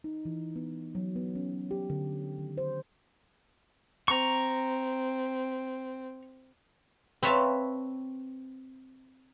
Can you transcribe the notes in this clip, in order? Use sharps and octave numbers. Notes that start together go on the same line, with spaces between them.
D#4
E3
B3
F#3
B3
C#4
G4
D3
D#3
C5
C4 A#5 C#6
C4 B4 C#5 E5 F5 A5